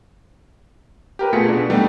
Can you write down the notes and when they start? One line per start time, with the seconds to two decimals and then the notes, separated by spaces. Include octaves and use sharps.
1.19 G4 A#4 B4
1.33 B2 A3 F4 G#4 B6 C#7
1.48 B2 D4
1.70 G3 A3 B3 D4 D#4 G4